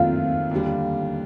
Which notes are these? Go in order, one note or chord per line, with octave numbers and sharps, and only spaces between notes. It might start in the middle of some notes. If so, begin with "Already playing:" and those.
Already playing: D#2 D#3 A3 C4 F4 F5
D#2 D3 G3